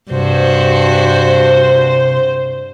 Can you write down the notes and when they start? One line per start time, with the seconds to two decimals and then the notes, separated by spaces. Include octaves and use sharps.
0.11 G2 C3 F#4 C5